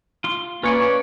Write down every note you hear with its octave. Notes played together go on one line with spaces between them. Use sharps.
F4 C6
A#3 C#4 F4 B4 C#5 D5